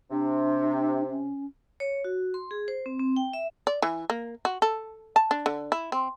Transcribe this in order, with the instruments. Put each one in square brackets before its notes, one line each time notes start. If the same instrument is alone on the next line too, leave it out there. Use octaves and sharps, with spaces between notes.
[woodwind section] C3 [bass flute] D4
[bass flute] C#4
[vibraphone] C#5
F#4
C6
G#4
C5
C4
C4
G5
E5
[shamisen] D5
E3
A#3
F#4
A4
A5
D4
D3
E4
C4